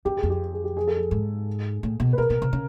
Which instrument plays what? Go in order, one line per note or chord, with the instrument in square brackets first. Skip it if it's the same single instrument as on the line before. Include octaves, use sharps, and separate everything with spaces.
[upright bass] F#2 [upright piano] G4
[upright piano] G#4
[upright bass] F2
[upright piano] G4
G#4
G4
G#4
A4
G#4
[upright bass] G#2
A2
B2
[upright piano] B4
[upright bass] B2 [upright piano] A#4
[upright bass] B2
C3
C#3